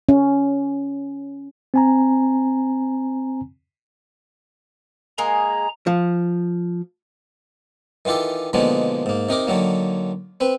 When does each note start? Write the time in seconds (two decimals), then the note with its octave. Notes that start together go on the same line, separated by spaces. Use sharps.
0.09 C#4
1.74 C4 G#5 A#5
5.18 G#3 A#3 G#4 A#5
5.87 F3
8.05 D#3 E3 F4 G4 A4
8.53 B2 D3 D#3 F3 G#3 A#3
9.06 G#2 A#3
9.29 C3 D#4 A#4 D6
9.47 D3 D#3 F#3 A#3
10.40 C4 B4